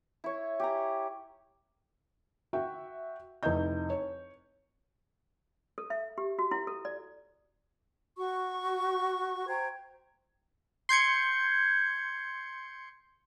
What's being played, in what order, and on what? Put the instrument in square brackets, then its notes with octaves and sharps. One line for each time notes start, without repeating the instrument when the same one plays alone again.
[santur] E4 C#5
G4 G#5 A#5
[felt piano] F#4 E5 G5
F1 D#4 E4 D#5 G6
C#5
[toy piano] A4
E5
G4
F#4
E4
A4
D5
[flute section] F#4 C#6
C5 G5 A#5 G#6
[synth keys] C6 G6 G#6 C#7